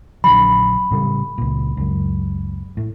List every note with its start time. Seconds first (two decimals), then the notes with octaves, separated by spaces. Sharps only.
0.24 A#1 D3 F#3 B5
0.91 A2 C#3 G3
1.38 C#2 A#2
1.77 C#2 F#2
2.77 A2